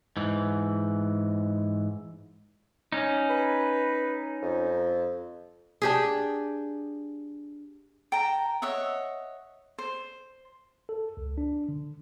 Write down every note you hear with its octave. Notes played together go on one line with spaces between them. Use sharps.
G#2 E3
C#4 D#4
B4
F2
D4 G4 G#4
G5 A5 A#5
C#5 D#5 E5 F#5
C5
A4
C#2
D4
D3